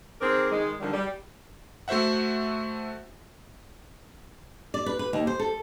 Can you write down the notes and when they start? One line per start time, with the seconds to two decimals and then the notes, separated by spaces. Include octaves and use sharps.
0.21 D#3 C4 G#4 A#4 D5
0.51 D#3 G#3
0.80 D3 D#3 F3 G3
0.93 G3
1.88 A3 F#4 C5 E5 F#5
4.74 D5
4.86 B4
4.99 B4
5.13 D#2
5.27 C5
5.39 A4